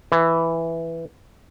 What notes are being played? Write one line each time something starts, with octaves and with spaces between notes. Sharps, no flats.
E3